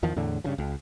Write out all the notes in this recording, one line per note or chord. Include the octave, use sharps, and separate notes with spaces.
E2 D#3 F3
E2 A2 D3
G2 C#3 F3
C#2